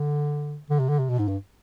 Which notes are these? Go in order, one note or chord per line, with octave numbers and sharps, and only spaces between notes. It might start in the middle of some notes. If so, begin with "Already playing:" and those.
Already playing: D3
D3
C3
D3
C3
B2
G#2
G2